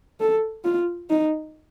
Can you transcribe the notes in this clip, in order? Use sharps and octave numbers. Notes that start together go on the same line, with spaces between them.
A4
F4
D#4